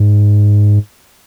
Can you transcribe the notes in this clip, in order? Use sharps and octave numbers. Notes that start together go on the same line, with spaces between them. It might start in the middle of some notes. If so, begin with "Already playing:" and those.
Already playing: G#2